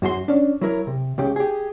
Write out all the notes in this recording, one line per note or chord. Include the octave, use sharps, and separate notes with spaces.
F#2 F#4 G#4 C6
C#4 D4
F#3 E4 A#4 C#5
C3
C#2 C#3 G4
G4 G#4